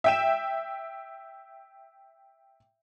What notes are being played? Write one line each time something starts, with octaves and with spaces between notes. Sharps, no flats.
E5 G5 E7